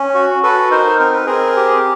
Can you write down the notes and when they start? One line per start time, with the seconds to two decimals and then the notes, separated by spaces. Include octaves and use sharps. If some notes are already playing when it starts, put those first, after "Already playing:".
Already playing: C#4
0.15 F#4
0.43 F#4 A4 B4
0.71 D#4 A#4 C5
0.99 C4 A#4
1.13 B4
1.26 C4 G#4 A#4
1.56 G4